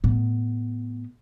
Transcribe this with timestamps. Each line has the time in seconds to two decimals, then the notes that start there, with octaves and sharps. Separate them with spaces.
0.04 A2 B3